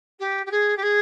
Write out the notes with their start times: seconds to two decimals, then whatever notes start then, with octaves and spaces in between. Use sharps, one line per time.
0.19 G4
0.46 G4
0.51 G#4
0.77 G4
0.82 G#4